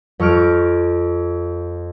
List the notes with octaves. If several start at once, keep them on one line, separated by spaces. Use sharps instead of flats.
F2 C#6 F6 D7